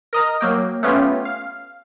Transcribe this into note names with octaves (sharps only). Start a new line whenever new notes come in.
A#4 D#5 A#5
F#3 A#3 G5
A3 B3 C#4 F4 G4
F5